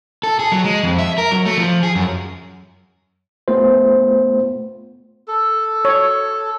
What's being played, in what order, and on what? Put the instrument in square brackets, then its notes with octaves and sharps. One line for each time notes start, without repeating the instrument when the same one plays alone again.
[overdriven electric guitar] A4
G#4
F#3
G#3
F2
E5
A#4
F#3
A3
F3
G#4
F#2
[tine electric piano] A3 B3 F4 C5
[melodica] A4
[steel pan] C#5